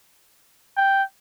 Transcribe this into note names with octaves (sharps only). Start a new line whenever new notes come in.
G5